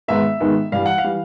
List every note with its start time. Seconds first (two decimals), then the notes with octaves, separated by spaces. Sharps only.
0.08 G#2 D#3 G#3 B3 E5
0.40 G#2 D#3 G#3 B3
0.72 G2 E3 G3 F5
0.86 F#5
0.98 F5
1.04 E3 G3